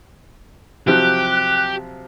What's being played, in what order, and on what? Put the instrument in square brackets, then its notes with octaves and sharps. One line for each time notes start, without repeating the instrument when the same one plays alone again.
[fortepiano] C3 F3 F#3 [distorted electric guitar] G4 [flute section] F#6